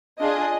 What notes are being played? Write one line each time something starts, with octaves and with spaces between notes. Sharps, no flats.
D4 F4 G#4 D#5